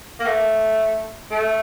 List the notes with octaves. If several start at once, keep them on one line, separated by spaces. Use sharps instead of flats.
A#3
A3
A3